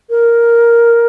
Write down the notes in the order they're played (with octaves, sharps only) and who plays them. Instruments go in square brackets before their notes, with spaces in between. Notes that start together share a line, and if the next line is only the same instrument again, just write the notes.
[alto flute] A#4